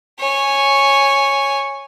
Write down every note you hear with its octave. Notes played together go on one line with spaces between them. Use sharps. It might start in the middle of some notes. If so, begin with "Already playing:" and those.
C#5 G#5